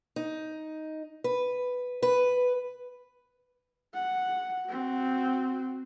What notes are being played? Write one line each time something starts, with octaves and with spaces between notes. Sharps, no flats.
D#4
B4
B4
F#5
C4 F#4